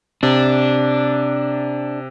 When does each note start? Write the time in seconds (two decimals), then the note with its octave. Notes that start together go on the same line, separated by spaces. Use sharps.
0.23 C3 D4